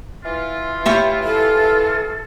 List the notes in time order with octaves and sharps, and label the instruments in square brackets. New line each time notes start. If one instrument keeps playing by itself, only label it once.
[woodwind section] E3 F4
[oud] E4 G4 C#5
[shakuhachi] A4